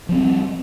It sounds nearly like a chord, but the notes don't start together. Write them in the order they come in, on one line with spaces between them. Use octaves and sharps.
F3 B3 C4 G3